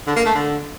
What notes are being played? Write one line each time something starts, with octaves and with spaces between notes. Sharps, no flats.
D3
A#3
A3
D3